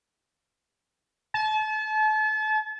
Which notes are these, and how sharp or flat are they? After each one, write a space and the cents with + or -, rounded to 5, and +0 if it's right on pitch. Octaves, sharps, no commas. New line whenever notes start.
A5 -35